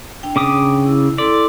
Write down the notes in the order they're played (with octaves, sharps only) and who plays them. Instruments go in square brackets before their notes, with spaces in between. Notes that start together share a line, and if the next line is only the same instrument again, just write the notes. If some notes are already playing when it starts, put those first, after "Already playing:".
[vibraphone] D4 G5
[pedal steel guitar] C#3 D6 D#6
[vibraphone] E4
[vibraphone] E4 A4 C6 [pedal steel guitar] D5